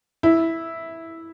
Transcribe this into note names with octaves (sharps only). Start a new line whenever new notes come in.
E4